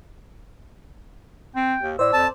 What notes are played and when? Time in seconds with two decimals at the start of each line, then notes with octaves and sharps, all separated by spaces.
1.56 C4 G5
1.82 D#2
1.99 A2 C5 D5 E6
2.13 F2 A5